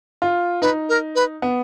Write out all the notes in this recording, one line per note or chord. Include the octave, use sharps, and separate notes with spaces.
F4
D#4 B4
A#4
B4
B3